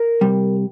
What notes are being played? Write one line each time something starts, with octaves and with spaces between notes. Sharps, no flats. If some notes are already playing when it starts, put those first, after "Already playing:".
Already playing: A#4
C3 G3